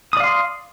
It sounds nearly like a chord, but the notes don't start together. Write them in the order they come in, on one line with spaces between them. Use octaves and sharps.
D#6 D5 F5 C6